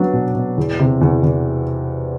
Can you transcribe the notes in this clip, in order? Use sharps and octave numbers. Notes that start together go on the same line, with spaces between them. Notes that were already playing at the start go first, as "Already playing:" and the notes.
Already playing: F#3 B3 D4
B2
B2
E2
C3
E2
E2